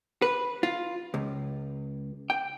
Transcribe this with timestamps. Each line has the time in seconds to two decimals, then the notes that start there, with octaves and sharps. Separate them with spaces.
0.22 B4
0.63 F4
1.14 C#2
2.30 G5